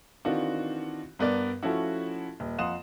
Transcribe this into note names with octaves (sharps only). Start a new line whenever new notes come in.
D#3 E3 C4 D4 F4 F#4
G2 B3 A#4 D5
F3 A3 C#4 E4 F#4
D#1
F2 F5 F#5 C6 D#6 E7